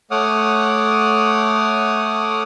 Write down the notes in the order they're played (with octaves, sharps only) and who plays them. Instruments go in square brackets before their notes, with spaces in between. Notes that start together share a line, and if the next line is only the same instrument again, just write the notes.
[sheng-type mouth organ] A3 C#5 F#5 D6 D#6 F6